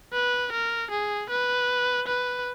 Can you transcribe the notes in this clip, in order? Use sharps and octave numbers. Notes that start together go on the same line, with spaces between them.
B4
A#4
G#4
B4
B4